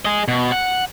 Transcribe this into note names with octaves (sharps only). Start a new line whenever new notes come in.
G#4 D#5
B2
F#5